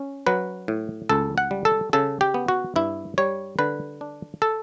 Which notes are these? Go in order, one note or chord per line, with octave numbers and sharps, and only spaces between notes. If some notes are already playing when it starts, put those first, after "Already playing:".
Already playing: C#4
F#3 B4
A2
C#2 A4
F#5
G3
A4
C#3 A4
G4
B3
F#4
G2 E4
G3 C#5
D3 B4
D4
A4